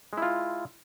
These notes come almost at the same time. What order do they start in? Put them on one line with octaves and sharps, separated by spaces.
G#3 E4 F4